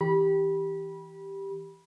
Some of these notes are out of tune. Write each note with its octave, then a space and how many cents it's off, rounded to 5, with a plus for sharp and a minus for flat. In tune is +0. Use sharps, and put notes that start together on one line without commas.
E3 -20 G4 +0 B5 -25